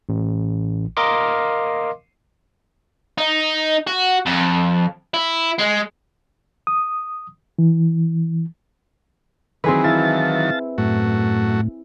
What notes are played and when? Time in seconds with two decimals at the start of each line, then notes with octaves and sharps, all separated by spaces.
0.09 A1
0.97 A#4 D#5 F5 C6 D6
3.18 D#4
3.87 F#4
4.26 F2
5.14 E4
5.58 G#3
6.67 D#6
7.59 E3
9.64 D#3 E3 F#3 C4 G#4 B4
9.84 E4 F5 A5 A6
10.78 F#2 A2 A3 F#4